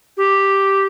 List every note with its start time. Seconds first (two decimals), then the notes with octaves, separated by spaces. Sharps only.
0.17 G4